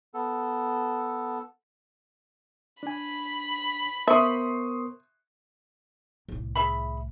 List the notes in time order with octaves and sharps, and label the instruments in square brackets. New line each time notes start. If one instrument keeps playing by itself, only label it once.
[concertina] B3 A4
[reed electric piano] D4 G#5 [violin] B5
[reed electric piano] B3 A#4 C5 [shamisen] E5 [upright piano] C6 C#6 D#6
[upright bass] C2 A2
[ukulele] G#4 E5 B5